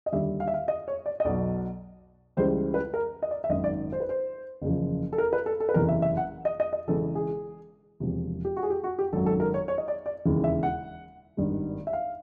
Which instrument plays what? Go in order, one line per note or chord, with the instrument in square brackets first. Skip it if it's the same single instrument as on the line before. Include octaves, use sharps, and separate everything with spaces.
[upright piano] D#5
D#2 D3 G3 E5
F5
E5
F5
D#5
C#5
D5
D#5
B1 B2 F#3 D5
C#2 C#3 E3 G3 C5
B4
A#4
D#5
D5
E5
G#1 F#2 D#3 D#5
D5
C5
B4
C5
F#1 E2 C#3 F3
A4
A#4
B4
A4
A4
B4
F#1 E2 C3 E3 A#4
E5
E5
F#5
D#5
D#5
D#5
E1 E2 C#3 E3 A4
G#4
E1 E2 C3 F3
G4
F#4
G#4
G4
F#4
G4
G#1 F#2 D#3 F#3 A4
A4
A#4
C#5
C#5
D#5
D5
D5
E1 D#2 C#3 E3
E5
F#5
G#1 G2 D#3 G3
E5
F5